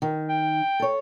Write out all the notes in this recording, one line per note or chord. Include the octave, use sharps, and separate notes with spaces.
D#3
G5
A4 C#5